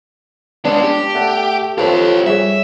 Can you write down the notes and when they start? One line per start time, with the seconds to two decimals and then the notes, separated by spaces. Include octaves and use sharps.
0.65 G#3 B3 C#4 D4
0.83 G4
1.15 A3 F#5 A5
1.78 F2 F4 G4 A4 B4 C#5
2.26 G3 G#4 C#5 E5